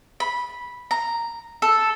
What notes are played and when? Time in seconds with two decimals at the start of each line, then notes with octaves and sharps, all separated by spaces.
0.20 B5
0.91 A#5
1.62 A4